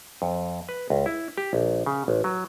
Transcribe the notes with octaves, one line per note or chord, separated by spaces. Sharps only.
F2
B4
C#2
E4
G4
A#1
C#3
A1
F#3